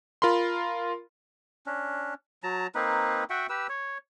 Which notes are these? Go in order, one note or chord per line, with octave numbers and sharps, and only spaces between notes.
F4 A#4 B5 C6
C#4 D4
F#3 A5 A#5
A#3 C4 D#4 B4
F#4 E5 F#5 G5
G4 B4 E6
C#5